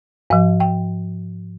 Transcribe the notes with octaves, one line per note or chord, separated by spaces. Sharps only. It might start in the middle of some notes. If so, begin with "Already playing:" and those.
G#2 F3 F5
G5